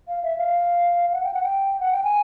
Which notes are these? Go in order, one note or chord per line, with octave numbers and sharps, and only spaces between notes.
F5
E5
F5
F#5
G5
F#5
G5
F#5
G5
G#5